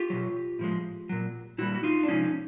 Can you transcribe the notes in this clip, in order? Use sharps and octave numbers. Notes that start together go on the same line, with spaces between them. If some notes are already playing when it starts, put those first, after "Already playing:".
Already playing: F4 G4
B2 F#3
A2 F3 G#3
A#2 F#3
A#2 G3 E4 F#4
F#4
D#4 F4
D4
C3 F3 G#3 C#4 D#4